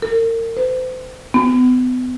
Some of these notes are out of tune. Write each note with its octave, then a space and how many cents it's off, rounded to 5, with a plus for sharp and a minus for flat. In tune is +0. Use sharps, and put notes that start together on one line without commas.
A#4 -35
C5 -40
B3 +35